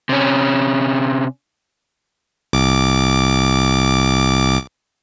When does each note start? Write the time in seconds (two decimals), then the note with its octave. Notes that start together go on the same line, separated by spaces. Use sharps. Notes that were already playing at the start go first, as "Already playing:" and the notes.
0.09 C3 C#4
2.53 C2 D6